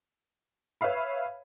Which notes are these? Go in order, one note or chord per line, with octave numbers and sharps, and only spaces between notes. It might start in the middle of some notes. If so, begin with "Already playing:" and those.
B4 C#5 E5 F5 B5